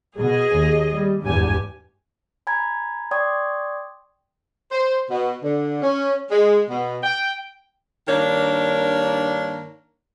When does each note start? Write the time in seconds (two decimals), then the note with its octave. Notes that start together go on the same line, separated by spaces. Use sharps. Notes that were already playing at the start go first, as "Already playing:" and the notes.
0.17 B2 G#4 D#5
0.54 D#2
0.91 G3
1.23 G#1 E2 G2 G4 G#5
2.47 G#5 A#5 B5 G#6
3.11 D5 G5 C6 C#6 D#6 G#6
4.72 C5
5.11 B2
5.43 D3
5.82 C#4
6.31 G#3
6.69 B2
7.03 G5
8.08 G2 D#3 A#3 D4 A#4 C#5